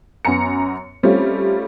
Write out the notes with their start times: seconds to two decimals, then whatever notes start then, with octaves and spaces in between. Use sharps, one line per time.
0.25 F#2 B3 G#5 A#5 C#7
1.03 G3 A3 C4 C#4 F4